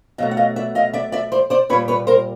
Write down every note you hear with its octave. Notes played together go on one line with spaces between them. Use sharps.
B2 F#3 A3 D#5 F5
F#5
D#5 F5
D5 E5
D#5 F5
D5 E5
D5 E5
C5 D5
C5 D5
A#2 G3 B4 C#5
B4 C#5
A#4 C5